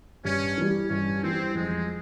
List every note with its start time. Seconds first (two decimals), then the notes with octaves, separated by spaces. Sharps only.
0.25 G2 C#4
0.57 E3 G3
0.90 G2 C#4
1.23 E3 G3 C4
1.55 F2 G#3